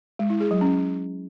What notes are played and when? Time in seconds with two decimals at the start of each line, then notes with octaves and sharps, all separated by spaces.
0.19 G#3
0.30 E4
0.40 G#4
0.51 F#3
0.61 C#4